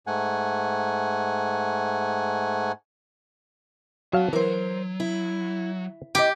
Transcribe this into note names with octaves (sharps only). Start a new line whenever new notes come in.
G#2 A3 F#5 G#5
F#3 C4 F5 A5
E3 F#3 A#4 C5
E4
E4 G4 D#5